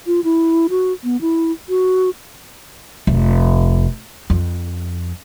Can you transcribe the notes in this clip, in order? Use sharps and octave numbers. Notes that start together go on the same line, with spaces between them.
F4
E4
F#4
B3
E4
F#4
F1
F2